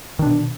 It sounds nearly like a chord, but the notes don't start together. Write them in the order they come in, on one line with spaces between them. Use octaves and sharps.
D#3 D4 B2